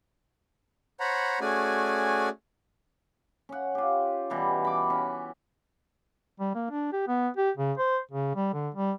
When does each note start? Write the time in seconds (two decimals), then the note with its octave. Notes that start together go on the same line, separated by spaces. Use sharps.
1.00 C5 C#5 F#5 A#5 B5
1.41 A3 C#4 F#4 G#4 D5 G#5
3.49 C#4 F#5
3.75 F4 G4
4.30 B2 E3 G3
4.65 B5 D6
4.90 C#4
6.40 G3
6.55 A#3
6.71 D4
6.93 G4
7.08 B3
7.37 G4
7.57 C#3
7.78 C5
8.11 C#3
8.36 G3
8.53 D3
8.75 G3